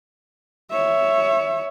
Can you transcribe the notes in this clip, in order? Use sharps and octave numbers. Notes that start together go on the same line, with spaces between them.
C#5 E5